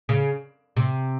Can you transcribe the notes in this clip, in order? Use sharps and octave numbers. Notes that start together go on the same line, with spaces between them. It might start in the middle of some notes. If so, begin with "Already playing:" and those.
C#3
C3